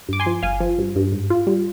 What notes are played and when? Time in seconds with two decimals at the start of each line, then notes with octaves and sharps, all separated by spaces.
0.09 G2 D6
0.20 G#5 C6
0.26 F3
0.43 G1 F5 G#5
0.60 F3
0.78 G2
0.96 G2
1.12 G#2
1.30 F4
1.47 G3